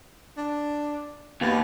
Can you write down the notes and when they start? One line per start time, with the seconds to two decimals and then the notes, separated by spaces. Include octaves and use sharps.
0.37 D4
1.41 D#2 B3